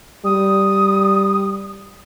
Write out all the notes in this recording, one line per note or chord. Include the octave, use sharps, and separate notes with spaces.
G3 D#6